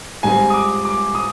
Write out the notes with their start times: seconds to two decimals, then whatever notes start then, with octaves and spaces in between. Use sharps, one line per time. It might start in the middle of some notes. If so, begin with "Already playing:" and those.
0.23 G#2 G3 C4 G#5
0.50 D#6
0.54 D6
0.85 D6
1.15 D#6